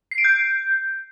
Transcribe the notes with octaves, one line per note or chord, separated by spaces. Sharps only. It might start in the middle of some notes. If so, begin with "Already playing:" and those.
C7
D7
G6